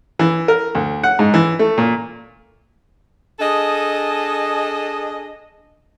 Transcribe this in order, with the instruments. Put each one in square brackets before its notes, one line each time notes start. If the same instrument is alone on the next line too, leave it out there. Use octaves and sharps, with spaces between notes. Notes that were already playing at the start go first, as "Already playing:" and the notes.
[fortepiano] E3
A#4
D2
F#5
G#2
E3
A3
A#2
[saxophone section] D4 G#4 A4 D#5